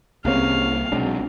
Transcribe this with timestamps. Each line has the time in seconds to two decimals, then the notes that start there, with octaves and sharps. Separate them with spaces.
0.25 C2 C3 G#3 A#3 C4 C#4 F5
0.92 B1 F#3 G#3 C4 D4